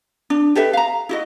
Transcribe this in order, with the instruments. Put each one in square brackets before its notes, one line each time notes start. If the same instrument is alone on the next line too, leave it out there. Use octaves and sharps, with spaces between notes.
[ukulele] D4
G4 A4 B4 E5
F5 A#5
E4 F#4 D#5